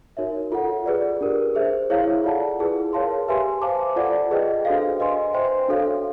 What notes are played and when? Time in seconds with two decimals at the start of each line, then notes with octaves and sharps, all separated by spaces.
0.17 D#4 F#4 A#4 C#5 E5
0.52 F4 A4 C#5 F#5
0.86 G#4 B4 D5
1.21 D4 G4 A#4
1.55 G#4 C5 E5
1.90 E4 G#4 C#5 F5
2.24 F4 A4 D5 F#5 A5
2.59 E4 G#4 B4
2.93 A#4 C#5 F5 A5 C6
3.28 G4 B4 E5 G#5 C6
3.62 C5 F5 A5 D6
3.96 F4 A4 D5 F#5 A5
4.31 G#4 B4 D#5 G5
4.65 D4 F#4 A4 C5 F5
5.00 B4 D#5 G#5 C6
5.33 C5 E5 G5 C6
5.68 D4 F#4 A4 C#5 F5